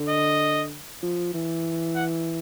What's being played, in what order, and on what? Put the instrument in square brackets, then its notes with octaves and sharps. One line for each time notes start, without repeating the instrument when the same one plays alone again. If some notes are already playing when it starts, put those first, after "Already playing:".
Already playing: [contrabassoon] D3
[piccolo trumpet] D#5
[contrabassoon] F3
E3
[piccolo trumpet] F#5